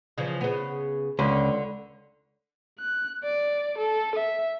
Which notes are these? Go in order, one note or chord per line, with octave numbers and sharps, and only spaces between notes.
C#3 E3 F3
C#3 B3
C#2 D3
F#6
D5
A4
E5